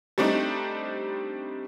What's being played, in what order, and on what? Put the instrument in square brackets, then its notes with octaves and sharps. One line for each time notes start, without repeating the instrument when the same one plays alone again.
[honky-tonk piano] G3 A3 C4 D4 D#4